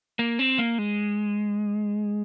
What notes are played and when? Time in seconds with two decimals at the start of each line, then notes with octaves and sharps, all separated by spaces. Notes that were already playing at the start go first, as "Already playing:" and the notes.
0.19 A#3
0.39 C4
0.59 A#3
0.78 G#3